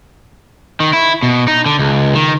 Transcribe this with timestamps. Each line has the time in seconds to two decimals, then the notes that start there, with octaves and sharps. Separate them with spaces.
0.80 D#3
0.93 E4
1.23 B2
1.48 D#4
1.66 D3
1.79 C#2
2.15 D#3